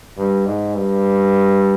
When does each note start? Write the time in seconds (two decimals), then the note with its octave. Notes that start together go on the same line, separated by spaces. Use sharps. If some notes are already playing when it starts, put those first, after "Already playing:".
0.17 G2
0.46 G#2
0.75 G2